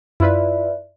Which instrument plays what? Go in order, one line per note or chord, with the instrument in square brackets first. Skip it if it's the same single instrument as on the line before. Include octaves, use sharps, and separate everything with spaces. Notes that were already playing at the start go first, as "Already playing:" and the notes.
[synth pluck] F#2 [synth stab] E4 F4 B4 [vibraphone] D5 E5